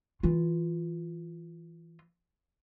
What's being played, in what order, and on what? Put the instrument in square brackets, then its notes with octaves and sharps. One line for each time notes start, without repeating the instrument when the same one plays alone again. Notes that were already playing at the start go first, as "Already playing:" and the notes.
[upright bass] E3 F4